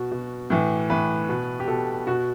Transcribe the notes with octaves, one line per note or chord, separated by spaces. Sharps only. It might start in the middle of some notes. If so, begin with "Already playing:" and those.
Already playing: B2 F#4
B2
A2 E3
A2 E3 B4
B2
G4
B2 A4
B2 F#4